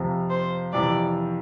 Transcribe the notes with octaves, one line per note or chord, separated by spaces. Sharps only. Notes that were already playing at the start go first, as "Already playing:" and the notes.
Already playing: F2 C3 F3
C5
F2 C3 E3 D5